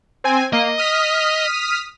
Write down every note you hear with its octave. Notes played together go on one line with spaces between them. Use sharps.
C4 G#5
A#3 D#5
D#6 F6 B6